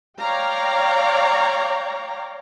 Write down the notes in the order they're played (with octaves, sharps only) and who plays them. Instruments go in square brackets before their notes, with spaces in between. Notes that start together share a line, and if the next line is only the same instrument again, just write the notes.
[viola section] C#5 D5 F5 G5 A#5